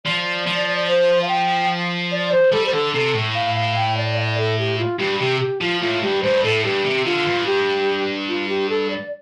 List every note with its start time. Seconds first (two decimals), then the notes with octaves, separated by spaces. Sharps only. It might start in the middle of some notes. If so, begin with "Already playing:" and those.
0.05 F3 D5
0.47 F3
0.88 C5
1.22 F5
1.28 G5
2.12 D5
2.32 C5
2.52 G3 A4
2.66 C5
2.73 D3 A4
2.94 C3 A4
3.14 A2
3.35 F5
3.56 F5
3.76 G5
3.97 D5
4.17 F5
4.20 D5
4.38 A4
4.59 G4
4.78 F4
4.99 G2 G4
5.20 C3 G4
5.41 G4
5.61 F3 F4
5.81 A2 F4
6.02 G2 G4
6.23 G2 C5
6.44 A2 A4
6.64 G2 G4
6.84 C3
7.05 D3 F4
7.26 G2
7.46 G4
8.28 F4
8.49 G4
8.69 A4
8.90 D5